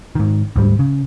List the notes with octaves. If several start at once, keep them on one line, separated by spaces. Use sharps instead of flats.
G#2 D#3
D2 G#2 G3
C#3